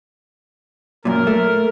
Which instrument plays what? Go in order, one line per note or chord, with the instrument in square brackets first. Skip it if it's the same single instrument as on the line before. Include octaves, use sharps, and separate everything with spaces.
[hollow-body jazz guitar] F#2 A#2 [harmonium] A#4
[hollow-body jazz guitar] A3